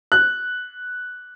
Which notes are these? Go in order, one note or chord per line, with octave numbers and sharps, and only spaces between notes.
F#6